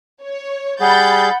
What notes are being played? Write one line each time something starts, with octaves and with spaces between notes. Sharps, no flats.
C#5
G3 G#4 F#5 B5 G6 A6